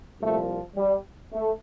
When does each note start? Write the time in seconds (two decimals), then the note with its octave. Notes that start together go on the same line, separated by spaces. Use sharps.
0.20 C2 A#2 F3 A3
0.76 G3
1.32 A3